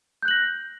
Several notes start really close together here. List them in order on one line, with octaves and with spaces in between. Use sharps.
G6 F#6 F#7 A#6